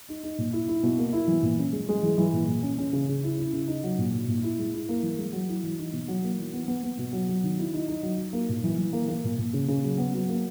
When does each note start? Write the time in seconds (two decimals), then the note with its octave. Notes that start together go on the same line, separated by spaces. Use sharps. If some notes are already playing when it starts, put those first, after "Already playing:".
0.09 D#4
0.23 D#4
0.38 A#2
0.53 E4
0.68 E4
0.83 B2
0.98 A#3
1.13 E4
1.28 E3
1.43 A#2
1.59 C#4
1.73 G#3
1.89 G#3
2.03 E3
2.18 E3
2.33 A#2
2.48 A#2
2.63 C#4
2.78 C#4
2.93 C#3
3.08 C#3
3.24 E4
3.38 E4
3.53 C#3
3.68 D#4
3.83 F#3
3.98 A#2
4.14 A#2
4.28 A#2
4.43 E4
4.59 G#3
4.74 E4
4.89 A#3
5.03 E3
5.18 G#3
5.33 F#3
5.48 E4
5.64 E3
5.79 D#4
5.93 B2
6.08 F#3
6.23 A#3
6.39 E3
6.54 B3
6.68 B3
6.83 B3
6.98 B2
7.13 F#3
7.29 F#3
7.43 D#3
7.58 E4
7.74 D#4
7.88 D#4
8.03 F#3
8.18 F#3
8.33 A#3
8.49 A#2
8.64 E3
8.79 E3
8.93 A#3
9.08 A#3
9.24 A#2
9.38 A#2
9.53 C#3
9.68 C#3
9.83 F#3
9.98 B3
10.14 F#3
10.29 A#3